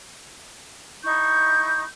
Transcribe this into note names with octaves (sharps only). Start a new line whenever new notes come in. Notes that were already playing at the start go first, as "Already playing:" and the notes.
D#4 E4 C#6 G6